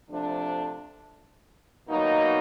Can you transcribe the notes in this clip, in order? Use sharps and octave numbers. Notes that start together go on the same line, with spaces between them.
C3 F3 A3 D4
B2 F#3 A#3 D#4